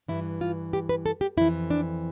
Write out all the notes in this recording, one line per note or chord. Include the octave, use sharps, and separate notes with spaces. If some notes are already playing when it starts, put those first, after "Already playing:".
G2 E3 E4
F4
G4
B4
A4
G4
F2 E3 E4
D4